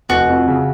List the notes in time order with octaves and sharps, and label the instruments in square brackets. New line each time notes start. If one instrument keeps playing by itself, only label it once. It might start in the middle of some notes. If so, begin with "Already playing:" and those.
[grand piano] F1 [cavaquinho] F#4
[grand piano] F2
C#3